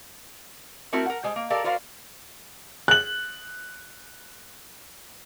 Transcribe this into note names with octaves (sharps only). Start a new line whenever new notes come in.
A3 C4 E4 F#4 A#4
A#4 F#5
G3 G#3 C5
A#3
G4 A4 A#4 D5 F5
F#4 A#4 C5 D5 D#5 F5
F#6 F#7